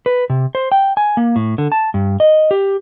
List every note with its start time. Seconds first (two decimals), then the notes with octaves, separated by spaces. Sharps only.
0.06 B4
0.30 C3
0.55 C5
0.72 G5
0.97 G#5
1.17 A#3
1.36 A2
1.58 D3
1.72 A5
1.94 G2
2.20 D#5
2.51 G4